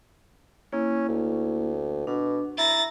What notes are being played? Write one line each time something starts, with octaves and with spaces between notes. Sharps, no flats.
A#3 C#4 E4
D2
B2 D4
E4 A#5 A6 A#6